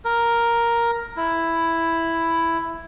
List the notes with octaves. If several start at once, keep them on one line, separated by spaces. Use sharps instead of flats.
A#4
E4